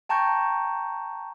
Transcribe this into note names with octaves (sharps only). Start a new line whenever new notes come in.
G5 A5 A#5 C#6 G6